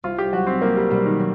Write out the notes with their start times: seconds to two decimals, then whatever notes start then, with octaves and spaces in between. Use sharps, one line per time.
0.04 C2 F4
0.18 G4
0.33 F#3 F#4
0.47 C4
0.62 C2 A#3
0.76 G3
0.91 B2 G3
1.06 D#3
1.20 F#3